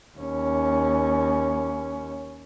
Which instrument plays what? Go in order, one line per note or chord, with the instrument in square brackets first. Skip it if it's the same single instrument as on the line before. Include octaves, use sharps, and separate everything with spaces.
[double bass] D#2 C#4